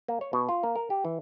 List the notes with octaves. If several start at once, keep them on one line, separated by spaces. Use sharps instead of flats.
A#3
C#5
B2
F4
A#3
A#4
G4
E3